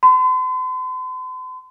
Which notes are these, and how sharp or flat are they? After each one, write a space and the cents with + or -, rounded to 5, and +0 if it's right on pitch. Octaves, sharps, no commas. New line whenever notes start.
C6 -45